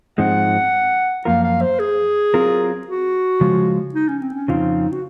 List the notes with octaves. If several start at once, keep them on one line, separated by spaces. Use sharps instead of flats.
G#2 F3 G#3 C4 D#4 F#5
F#2 F3 A#3 F4 A#4 F5
F5
C5
G#4
F#3 C4 F4 A#4
F#4
C#3 F3 G#3
D#4
C#4
C4
C#4
F2 C#3 F3 C4 D#4 F4
F#4